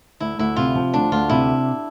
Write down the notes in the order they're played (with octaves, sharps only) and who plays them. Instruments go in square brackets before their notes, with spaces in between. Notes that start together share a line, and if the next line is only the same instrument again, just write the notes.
[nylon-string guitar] D2 [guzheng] E4
[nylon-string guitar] D2 [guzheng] E4
[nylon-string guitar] C3 [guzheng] F4
[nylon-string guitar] F3
[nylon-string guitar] D2 [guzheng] D4
[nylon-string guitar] D2 [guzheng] F4
[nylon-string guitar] C3 [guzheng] E4